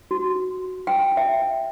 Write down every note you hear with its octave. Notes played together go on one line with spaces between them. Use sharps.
F#4
G5
E5